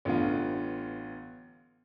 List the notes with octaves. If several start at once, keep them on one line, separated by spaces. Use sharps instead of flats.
A1 D3 B3 F4